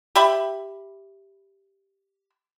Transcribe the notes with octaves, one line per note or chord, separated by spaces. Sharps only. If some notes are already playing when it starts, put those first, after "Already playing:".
G4 E5 B5